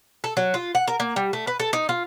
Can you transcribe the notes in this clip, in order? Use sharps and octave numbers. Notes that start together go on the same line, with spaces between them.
A4
F#3
F4
F#5
A#4
A#3
G3
A3
B4
A4
D#4
F4